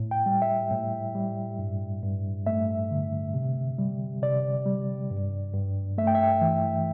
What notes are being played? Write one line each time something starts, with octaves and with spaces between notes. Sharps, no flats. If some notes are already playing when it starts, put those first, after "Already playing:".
Already playing: A2
G5
G3
E5
A2
G3
G2
G2
A3 E5
D3
C3
G3
C3 D5
G3
G2
G2
A3 E5
G5
E5
E3